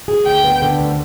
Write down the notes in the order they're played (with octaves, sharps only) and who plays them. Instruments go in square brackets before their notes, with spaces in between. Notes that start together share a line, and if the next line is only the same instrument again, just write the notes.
[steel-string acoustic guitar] G#4
[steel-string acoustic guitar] D2 [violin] G5
[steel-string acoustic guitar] B3
D3
D2